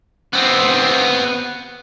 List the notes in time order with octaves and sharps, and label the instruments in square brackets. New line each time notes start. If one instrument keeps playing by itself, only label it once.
[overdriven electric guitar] B3 C4